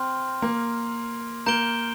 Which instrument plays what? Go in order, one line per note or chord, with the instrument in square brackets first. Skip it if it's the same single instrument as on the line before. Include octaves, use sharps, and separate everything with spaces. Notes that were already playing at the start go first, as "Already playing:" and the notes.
Already playing: [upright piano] C4 [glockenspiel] C6 F6
[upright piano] A#3
[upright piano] A#3 [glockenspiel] A#5 G6 D7 G7